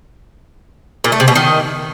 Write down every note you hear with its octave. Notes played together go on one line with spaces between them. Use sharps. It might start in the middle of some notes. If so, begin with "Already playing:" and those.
A#2
A3
C3
B2
D#3